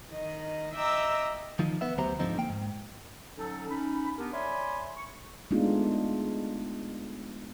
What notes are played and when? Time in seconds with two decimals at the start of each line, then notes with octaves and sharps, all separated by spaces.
0.12 D#3 D#5
0.75 D#5 E5 G5 A#5 D6 E6
1.59 D#3 F3 D#4
1.81 B3 E5
1.98 D2 F#3 B3 G4 C5 A#5
2.19 G#2 D3 F3 C4 D#4
2.38 A#3 G5
2.49 G#2
3.37 D3 F#3 C#4 D#4 A4
3.69 C#4 D#4 B5
4.18 B3 D4 G4 A#4
4.32 C#5 D5 E5 G#5 B5 C6
4.96 C#6
5.51 G#3 A3 B3 D4 D#4 F4